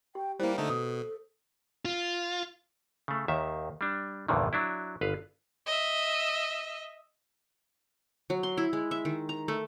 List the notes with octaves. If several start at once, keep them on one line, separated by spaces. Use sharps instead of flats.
G4 G5
G3 A#3 E4 C5
D3 A3 D#4 A4
B2 D#6
F4
C#3 A3
D#2 D#3 E5
G3 D4
A#1 E2 G2 A#2 D3 D#3
F#3 D4 E4
G1 B4 F5
D#5 E5
F#3
C6
E4
G#3
E5
D#3
A#5
A3